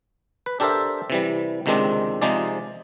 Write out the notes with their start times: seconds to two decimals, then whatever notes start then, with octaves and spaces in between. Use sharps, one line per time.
0.46 B4
0.60 D4 G4 A4 A#4 C5 E5
1.10 C3 E3 G3
1.66 C#2 C3 D#3 G#3 C4 D4
2.22 C3 F3 G#3 D#4 G#4 D5